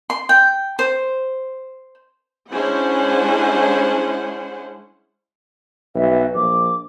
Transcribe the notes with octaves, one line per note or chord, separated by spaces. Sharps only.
C6
G5
C5
G#3 C#4 D4 E4 C5 F#5
B1 E5
A#1 D6